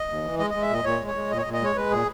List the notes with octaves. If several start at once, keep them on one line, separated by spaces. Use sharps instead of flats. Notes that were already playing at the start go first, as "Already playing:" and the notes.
Already playing: D#5
D#2
E3
G#3 D#5
G#3 D#5
E5
A#2 D#5
A#2 C#5
G#3
C#5
G#3
A#2 D#5
C#5
D#5
A#2
D#5
G#3 C#5
G#3 B4
A#2 G#4